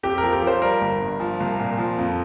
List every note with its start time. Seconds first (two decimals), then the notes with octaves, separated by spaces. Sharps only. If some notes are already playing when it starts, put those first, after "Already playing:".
0.03 F2 G4
0.18 F3 A#4
0.33 G4
0.42 F3
0.47 C5
0.62 G3 A#4
0.81 G1
1.01 G2
1.20 F3
1.40 C2
1.59 A#2
1.78 F3
1.98 F2